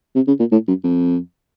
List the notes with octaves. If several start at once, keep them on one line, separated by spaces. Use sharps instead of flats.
C3
C#3
A#2
A2
F#2
F2